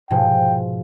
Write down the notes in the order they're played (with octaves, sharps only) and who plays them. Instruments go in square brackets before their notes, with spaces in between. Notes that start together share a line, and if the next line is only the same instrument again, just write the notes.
[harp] G#2 B2 F3 [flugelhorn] G5